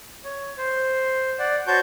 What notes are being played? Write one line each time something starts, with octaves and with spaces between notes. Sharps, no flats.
C#5
C5
D5 F#5
F#4 C5 C#5 A5 C#6 G6